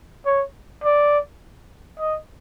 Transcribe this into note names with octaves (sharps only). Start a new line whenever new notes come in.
C#5
D5
D#5